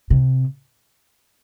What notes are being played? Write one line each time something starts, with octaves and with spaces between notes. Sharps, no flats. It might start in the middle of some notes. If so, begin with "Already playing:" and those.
C3